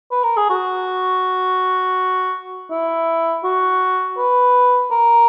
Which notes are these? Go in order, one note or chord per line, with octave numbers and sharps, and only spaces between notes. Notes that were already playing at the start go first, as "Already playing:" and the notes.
B4
A#4
G#4
F#4
E4
F#4
B4
A#4